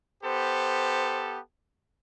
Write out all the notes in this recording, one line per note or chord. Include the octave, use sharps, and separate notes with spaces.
B3 G4 A4 C5